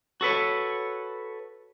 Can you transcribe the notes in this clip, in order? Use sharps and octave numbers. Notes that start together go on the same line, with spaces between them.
F#4 A4 B4 C#5